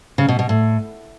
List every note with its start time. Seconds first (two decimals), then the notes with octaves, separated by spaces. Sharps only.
0.18 C#3
0.28 B2
0.39 B2
0.49 A2